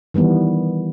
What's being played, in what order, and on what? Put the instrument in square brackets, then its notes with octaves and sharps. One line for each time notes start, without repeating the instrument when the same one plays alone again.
[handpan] D#3 E3 G3 B3